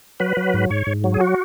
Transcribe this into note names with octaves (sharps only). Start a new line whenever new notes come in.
F#3 B4
F#3
G#2
G#2 C#5
G#2
F#3
G#4
F#4